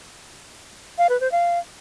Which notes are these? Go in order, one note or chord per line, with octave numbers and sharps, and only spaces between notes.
F5
B4
C5
F5